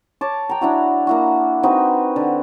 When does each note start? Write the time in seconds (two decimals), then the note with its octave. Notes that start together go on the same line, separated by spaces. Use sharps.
0.21 C#5 A5 D6
0.49 G5 A#5
0.61 D4 E4 F#4
1.07 A#3 E4 F#4
1.63 C4 D#4 F#4 B4
2.16 D3